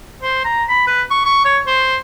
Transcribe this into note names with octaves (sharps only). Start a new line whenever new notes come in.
C5
A#5
B5
B4
C#6
C#6
C#5
C5